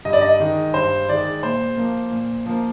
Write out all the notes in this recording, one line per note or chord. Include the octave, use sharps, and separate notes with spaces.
G2 D#5
D5
D#5
D#3 G#3
G2 C5
D#3 G#3 D5
A#2 C5
F3 A#3
A#2
F3 A#3